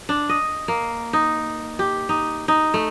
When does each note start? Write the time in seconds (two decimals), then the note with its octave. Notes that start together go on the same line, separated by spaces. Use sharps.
0.09 D4
0.29 D#5
0.68 A#3
1.13 D#4
1.79 G4
2.09 D#4
2.48 D#4
2.74 A3